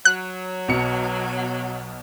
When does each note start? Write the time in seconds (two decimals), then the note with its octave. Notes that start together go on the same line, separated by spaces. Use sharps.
0.05 F#3 F#6
0.68 B1 B2 C#7